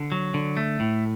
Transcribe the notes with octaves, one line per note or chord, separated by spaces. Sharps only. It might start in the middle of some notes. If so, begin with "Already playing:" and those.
Already playing: D3
F#3
D3
A3
A2